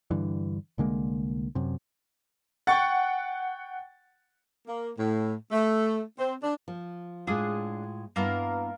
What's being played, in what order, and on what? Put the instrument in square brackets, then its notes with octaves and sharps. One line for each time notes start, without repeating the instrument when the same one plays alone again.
[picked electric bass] G2 D3 E3
C2 D3 G#3 A#3
F#2 C3
[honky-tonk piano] F#5 [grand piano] G5 C#6 A6
[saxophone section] A#3
A2
A3
C4
D4
[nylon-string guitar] F3
[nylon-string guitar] A2 G#3 F4 [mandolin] D4 G#4 D#6
[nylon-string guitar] G2 B3 E4 [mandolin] A#3 F4 A#4